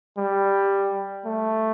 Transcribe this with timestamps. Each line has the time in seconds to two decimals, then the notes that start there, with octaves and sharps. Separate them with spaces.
0.17 G3
1.25 A3